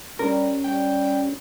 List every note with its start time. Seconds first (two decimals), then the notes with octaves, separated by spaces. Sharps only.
0.19 G3 C#4 A#4
0.64 G3 G5